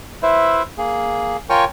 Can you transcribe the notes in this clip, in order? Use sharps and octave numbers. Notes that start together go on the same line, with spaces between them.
E4 B4 C5 E5
A#3 G#4
F4 A#4 C#5 G5 G#5 C#6